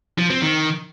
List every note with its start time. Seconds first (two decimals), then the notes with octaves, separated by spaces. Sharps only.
0.18 F3
0.30 C4
0.42 D#3